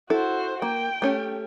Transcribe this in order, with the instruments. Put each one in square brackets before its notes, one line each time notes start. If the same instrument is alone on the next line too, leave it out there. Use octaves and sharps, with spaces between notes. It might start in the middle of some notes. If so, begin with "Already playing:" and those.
[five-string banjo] E4 A4 [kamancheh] F#4 C5
[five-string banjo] A#3 [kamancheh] G5
[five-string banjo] A3 C#4 G4